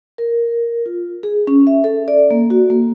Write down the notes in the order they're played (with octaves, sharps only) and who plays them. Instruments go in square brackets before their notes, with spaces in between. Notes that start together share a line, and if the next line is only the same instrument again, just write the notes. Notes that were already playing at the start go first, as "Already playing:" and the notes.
[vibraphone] A#4
F4
G#4
C#4
E5
A4
D5
A#3
F#4
A#3